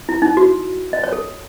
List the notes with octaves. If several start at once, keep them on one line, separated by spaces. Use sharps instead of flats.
E4
D#4
F#4
D#5
C#5
A4